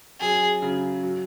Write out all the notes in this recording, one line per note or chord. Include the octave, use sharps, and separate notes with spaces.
F#2 G#4
C#3 F#3
F#3